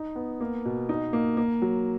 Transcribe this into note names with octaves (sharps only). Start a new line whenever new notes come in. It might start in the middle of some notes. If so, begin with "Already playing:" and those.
Already playing: D#4
B3
A#3
B2
D#4
A#3
A#3
F#3